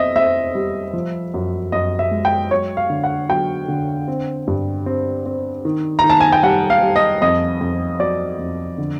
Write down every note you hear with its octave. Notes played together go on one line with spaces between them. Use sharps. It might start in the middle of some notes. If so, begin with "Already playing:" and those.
Already playing: C4 D#5 E5
C4 E5
G3
F3
F#2
F#2 D#5
E5
G#3
G5
F#3 C#5
F5
D3
F#5
F#3 G5
D3
C4
G2
C4
C4
D#3
D#3 A#5
A5
G#5
G5
G3 F#5
F5
G3
D#5
F2 D#5
F2
F#3 D5
F2
D3